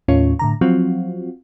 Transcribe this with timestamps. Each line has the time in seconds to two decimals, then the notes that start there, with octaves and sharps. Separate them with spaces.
0.08 D#2 A2 C#4 F4 C#5
0.39 A2 D3 A#5
0.61 F3 F#3 C4 F4 F#4